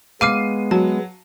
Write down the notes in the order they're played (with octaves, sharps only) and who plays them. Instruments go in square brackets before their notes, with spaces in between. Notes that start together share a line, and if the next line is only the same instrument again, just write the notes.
[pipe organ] G#3 B3 [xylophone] F5 D6 F6 [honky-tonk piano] C7 D#7
[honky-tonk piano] F#3 [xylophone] A5